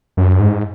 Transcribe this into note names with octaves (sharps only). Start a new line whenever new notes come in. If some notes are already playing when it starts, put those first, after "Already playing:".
F#2
G#2